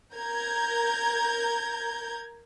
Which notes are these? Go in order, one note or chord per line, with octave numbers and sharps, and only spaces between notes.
A#4 A#5 G6 G#6